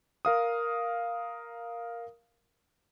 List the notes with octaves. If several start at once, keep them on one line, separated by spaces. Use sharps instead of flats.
A#4 F5 D#6